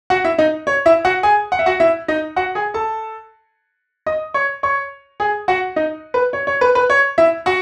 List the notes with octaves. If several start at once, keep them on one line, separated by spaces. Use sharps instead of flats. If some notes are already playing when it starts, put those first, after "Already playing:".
F#4 F#5
E4 E5
D#4 D#5
C#5
E4 E5
F#4 F#5
G#4 G#5
F#5
E5
F#4 F#5
E4 E5
D#4 D#5
F#4 F#5
G#4 G#5
A4 A5
D#5 D#6
C#5 C#6
C#5 C#6
G#4 G#5
F#4 F#5
D#4 D#5
B4
C#5
C#5
B4
B4
C#5
E4 E5
F#4 F#5